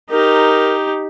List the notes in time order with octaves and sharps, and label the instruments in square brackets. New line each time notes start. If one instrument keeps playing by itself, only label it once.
[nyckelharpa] D#4 G4 [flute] A#4